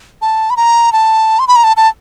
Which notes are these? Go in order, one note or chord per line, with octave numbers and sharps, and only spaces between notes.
A5
B5
A#5
A5
C6
B5
A#5
A5
A5